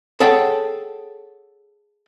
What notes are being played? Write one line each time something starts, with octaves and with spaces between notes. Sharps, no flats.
G#4 A4 C#5 F#5 G5 A5